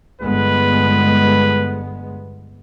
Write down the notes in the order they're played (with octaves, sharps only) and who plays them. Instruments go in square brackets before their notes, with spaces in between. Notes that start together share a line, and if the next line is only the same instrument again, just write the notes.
[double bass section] G1 G#3 B3 [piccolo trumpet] B4